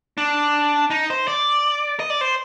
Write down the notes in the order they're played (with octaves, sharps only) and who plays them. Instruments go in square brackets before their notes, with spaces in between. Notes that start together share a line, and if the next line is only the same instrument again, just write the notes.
[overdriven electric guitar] D4
D#4
C5
D5
D#5
D5
C5